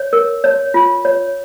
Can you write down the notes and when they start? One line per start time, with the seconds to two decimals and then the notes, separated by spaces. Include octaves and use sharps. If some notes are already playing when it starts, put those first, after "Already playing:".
Already playing: C#5
0.13 A#4
0.44 C#5
0.74 F4
1.05 C#5